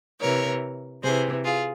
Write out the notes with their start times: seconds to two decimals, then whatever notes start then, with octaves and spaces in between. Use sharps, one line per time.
0.20 C3 E3 A#4 C#5
1.02 C3 E3 G#4 C5
1.44 F4 G#4